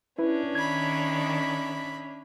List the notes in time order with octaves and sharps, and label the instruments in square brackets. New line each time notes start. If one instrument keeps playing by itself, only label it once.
[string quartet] C#4 D4 [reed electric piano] E4 B4
[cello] D#3 [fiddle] E5 B5 [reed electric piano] G#6